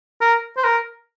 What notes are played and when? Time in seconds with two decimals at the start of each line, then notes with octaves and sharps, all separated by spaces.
0.21 A#4
0.57 C5
0.64 A#4